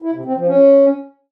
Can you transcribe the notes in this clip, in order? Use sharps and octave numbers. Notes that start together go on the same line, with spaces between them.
E4
C3
C4
F3
C#4